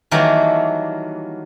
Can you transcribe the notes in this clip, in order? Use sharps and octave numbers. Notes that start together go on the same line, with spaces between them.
D#3 E3 F#3 G3 A3 A#3